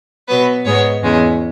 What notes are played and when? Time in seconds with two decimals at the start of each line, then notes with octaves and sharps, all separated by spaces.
0.28 B2 F#3 B3 B4
0.65 G#2 G#3 B3 C#5
1.03 E2 C#3 G#3